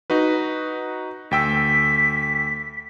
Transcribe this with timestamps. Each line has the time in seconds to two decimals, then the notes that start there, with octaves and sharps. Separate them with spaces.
0.10 D#4 F#4 B4
1.31 D2 G5 E6 B6